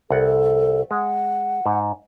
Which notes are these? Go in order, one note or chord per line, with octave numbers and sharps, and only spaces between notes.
C2 A4 F#5
G#3 F#5
G#2